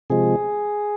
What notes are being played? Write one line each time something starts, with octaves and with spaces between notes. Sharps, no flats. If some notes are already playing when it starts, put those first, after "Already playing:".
C3 F3 G#3 G#4